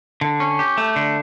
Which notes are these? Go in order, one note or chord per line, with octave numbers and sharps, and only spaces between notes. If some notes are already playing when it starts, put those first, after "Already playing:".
D3
C#4
G4
A3
D3